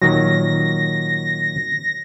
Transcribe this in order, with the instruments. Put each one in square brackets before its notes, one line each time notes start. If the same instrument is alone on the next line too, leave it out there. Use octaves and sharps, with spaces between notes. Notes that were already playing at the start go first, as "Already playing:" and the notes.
[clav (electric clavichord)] A#2 D#3 F#3 [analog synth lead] A#6